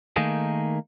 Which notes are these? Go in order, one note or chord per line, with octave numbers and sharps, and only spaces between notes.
D#3 A3 A#3 D#4 G#4